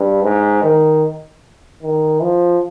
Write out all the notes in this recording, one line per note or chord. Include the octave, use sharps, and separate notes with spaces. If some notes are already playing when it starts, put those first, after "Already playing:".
Already playing: G2
G#2
D#3
D#3
F3